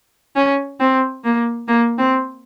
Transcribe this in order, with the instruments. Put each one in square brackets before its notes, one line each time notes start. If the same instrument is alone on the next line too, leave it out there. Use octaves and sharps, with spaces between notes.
[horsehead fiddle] C#4
C4
A#3
A#3
C4